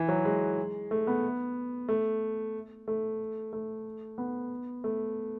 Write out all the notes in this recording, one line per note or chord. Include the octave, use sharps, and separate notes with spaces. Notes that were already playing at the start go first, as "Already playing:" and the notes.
Already playing: E3
F#3
G#3
A3
B3
A3
A3
A3
B3
A3